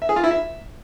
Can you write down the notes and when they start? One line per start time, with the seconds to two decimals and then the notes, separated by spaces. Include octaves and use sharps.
0.02 E5
0.09 G#4
0.16 F4
0.24 E4
0.31 E5